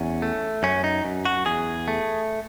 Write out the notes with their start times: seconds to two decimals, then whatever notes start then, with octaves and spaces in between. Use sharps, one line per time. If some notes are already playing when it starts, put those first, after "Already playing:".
Already playing: E2 C#4
0.22 A3
0.63 F#2 C#4
0.84 D#4
1.05 F#2
1.25 F#4
1.46 E2 G#4
1.88 A3